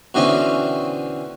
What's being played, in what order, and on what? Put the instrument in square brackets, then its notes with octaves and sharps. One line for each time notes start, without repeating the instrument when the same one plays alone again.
[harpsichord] B2 D3 E3 C4 C#4